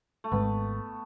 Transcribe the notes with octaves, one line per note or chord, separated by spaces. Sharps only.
A3
G#1 G#2 G#3 B3 C4